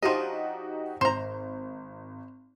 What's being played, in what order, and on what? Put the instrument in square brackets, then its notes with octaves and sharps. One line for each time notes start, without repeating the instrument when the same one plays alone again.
[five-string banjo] F3 D4 D#5 [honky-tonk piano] D#4 F#4 G4
[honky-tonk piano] G#1 [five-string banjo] C5 A#5